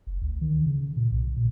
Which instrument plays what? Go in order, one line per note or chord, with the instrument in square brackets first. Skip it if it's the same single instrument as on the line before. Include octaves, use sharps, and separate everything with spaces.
[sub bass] F#1
D2
D#3
C#3
A#2
B1
A#2